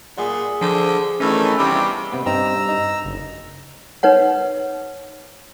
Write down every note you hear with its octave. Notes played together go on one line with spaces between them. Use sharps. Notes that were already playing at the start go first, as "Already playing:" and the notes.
A#2 G#4 E5 F#5
D3 F3
D#3 E3 A3 C#4
E2 G2 C3 G3
C3 B3
G2 C4 D#4 A#5 E6
D#4
F#1
D#4 B4 C#5 F#5